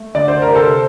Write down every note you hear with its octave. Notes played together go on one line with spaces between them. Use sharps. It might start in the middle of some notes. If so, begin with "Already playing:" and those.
Already playing: A3
D3 D5
C5
C3 A#4
A4 C5